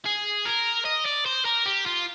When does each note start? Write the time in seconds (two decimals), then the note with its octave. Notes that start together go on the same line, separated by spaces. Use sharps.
0.05 G#4
0.45 A#4
0.85 D#5
1.06 D5
1.26 C5
1.45 A#4
1.66 G4
1.86 F4